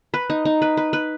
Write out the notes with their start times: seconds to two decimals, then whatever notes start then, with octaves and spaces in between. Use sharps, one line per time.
0.14 B4
0.30 D#4
0.45 D#4
0.62 B4
0.77 B4
0.93 B4